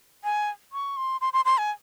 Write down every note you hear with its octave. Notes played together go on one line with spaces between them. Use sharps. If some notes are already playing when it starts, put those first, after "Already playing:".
G#5
C#6
C6
C6
C6
C6
G#5